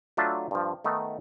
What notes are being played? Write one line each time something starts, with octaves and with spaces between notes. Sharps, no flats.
F#3 A3 D4 F4 E5 A5
G2 F3
D#3 A3 B3 D#4